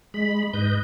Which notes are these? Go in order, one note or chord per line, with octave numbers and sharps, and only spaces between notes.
G#3 B5
G#2 B4 D#5 G6